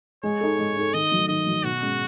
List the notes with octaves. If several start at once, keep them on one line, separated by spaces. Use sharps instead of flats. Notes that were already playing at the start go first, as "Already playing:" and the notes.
G#3 C#5
D#4 A4
G#3
D#4 A4
D#3 D#5
F#3 A3
D#3 D#5
F#3 A3
B2 F#4
G#3 C#4